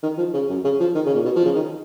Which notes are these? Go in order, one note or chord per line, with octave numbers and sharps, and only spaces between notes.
D#3
F3
C#3
F#2
C#3
F3
D#3
C#3
A#2
B2
F3
C#3
D#3